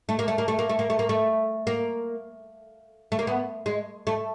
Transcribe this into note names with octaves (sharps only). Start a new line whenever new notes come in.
A3
A#3
A3
A#3
A3
A#3
A3
A#3
A3
A#3
A3
A#3
A3
A#3
B3
G#3
A3